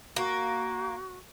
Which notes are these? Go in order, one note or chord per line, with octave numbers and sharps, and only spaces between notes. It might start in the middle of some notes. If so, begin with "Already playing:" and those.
A#3 F#4